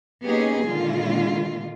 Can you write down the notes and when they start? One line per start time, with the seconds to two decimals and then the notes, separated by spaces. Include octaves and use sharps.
0.25 A#3 B3 C#4 D#4 G4 G#4
0.68 A#2 D3 D#3 G#3 F4